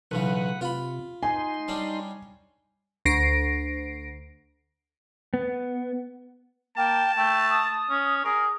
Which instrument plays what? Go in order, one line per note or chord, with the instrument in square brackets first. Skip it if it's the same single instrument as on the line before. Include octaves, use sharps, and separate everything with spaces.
[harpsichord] B1 E2 C#3 [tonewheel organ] B4 F#5
[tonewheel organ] C3 [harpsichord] F4 B5
[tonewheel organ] D#4 C6 [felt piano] G#5
[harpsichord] G3 C#4 D4
[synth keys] D2 A#6 C7 D7
[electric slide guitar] B3
[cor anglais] A#3 [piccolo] G5 [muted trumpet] A5
[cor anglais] A3 [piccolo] G5
[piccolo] D#6
[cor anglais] C#4
[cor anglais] G#4 [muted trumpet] A#4